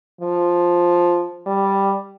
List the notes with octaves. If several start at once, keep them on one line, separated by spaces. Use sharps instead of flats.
F3
G3